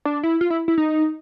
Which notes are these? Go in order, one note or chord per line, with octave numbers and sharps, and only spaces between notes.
D4
E4
F4
E4
E4
D#4